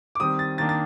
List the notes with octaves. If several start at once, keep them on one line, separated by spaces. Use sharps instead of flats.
D6
D#3 G3 C4 D#6
A6
D#3 A#3 D4 A6
A6